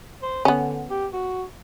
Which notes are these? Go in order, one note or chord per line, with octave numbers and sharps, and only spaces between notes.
C5
D3 B3 C#4
G4
F#4